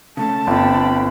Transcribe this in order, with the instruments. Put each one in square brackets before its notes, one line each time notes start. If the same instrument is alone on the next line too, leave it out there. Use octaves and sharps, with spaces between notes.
[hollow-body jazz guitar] C#3 A3 C#4 [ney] A5
[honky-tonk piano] G1 [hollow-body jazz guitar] C4 F4 [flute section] A4 G5 B5